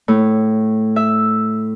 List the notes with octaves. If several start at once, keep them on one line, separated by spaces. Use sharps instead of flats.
A2
E5